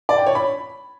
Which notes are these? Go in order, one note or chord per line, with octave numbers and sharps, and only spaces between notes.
D5
G5
C#5
B5